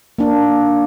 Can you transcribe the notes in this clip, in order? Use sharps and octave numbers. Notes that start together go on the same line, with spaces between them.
A#3 D4